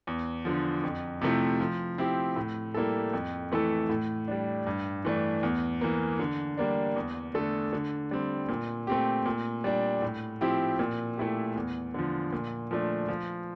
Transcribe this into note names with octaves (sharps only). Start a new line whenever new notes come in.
E2
D3 F3
F2
C3 F3 A3 E4
F3
C4 E4 G4
A2
G3 A#3 E4 A4
F2
E3 A3 E4 A4
A2
G3 D4
G2
E3 A3 D4
E2
E3 A#3
D3
G3 A#3 D4
E2
D3 A3 D4 A4
D3
G3 C4
A#2
A3 C4 G4
A#2
G3 D4
A2
F3 C4 E4 G4
A#2
A3 E4 G4
E2
D3 F3
A#2
F3 A3 D4
F3